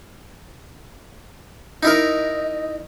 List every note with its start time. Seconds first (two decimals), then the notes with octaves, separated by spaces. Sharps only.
1.83 D#4 E4 A#4 D#5